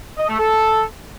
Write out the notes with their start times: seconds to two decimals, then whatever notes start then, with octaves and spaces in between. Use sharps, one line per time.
0.18 D#5
0.28 A3
0.39 A4